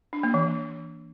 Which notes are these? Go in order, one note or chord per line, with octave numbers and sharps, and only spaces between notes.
D4
A#3
E3